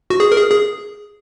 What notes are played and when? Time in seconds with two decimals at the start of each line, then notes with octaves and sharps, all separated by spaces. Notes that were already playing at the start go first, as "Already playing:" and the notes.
0.10 F#4
0.20 G#4
0.32 A#4
0.36 G#4
0.51 G#4